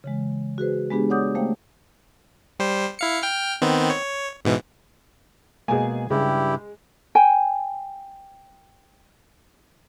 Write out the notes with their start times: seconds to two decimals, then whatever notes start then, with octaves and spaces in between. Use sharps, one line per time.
0.04 C#3 E3 G#3
0.58 F#4 G#4 B4 C5
0.91 G#3 B3 D4 G4 G#4
1.10 C#5 D5 F#5 D6 D#6 G6
1.35 A3 A#3 C5 F5 G5
2.60 G3 C5
2.99 E4 F5 C#7
3.23 G5 F6
3.62 D#3 B3 C4
3.90 C#5
4.45 G#2 B2 E3
5.68 B2 G#3 A#3 G#4 G#5
6.11 G2 C#3 G#3 E4 G4
7.15 G5 G#5